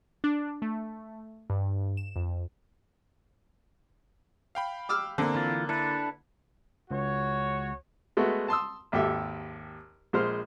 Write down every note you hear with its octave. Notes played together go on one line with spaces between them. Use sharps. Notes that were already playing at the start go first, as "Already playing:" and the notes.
D4
A3
G2
E7
F2
F5 G5 B5
D6 E6 F6
D3 A#3 C4
E3 F4
D4 E4 A4 B4
C#2 F#4 C#5
G#3 A3 B3 F#4
A5 C6 D#6 E6
G#1 D#2 G4 A4 E5
A#1 G#3 C5 F6